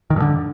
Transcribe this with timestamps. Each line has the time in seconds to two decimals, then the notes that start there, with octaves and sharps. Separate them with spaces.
0.10 D#3
0.16 G2
0.22 D3